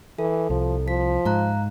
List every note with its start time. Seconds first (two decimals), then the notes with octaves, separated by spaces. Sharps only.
0.19 E3 A4
0.50 C2 F3
0.88 F3 B6
1.25 G#2 F5 A#5 F#6